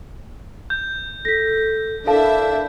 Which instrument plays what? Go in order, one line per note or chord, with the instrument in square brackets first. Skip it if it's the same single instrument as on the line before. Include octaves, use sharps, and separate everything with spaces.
[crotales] G6
[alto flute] A4 [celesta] A#6 B6
[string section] D4 E4 E5 [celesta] A4 F5 A5 [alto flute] A#4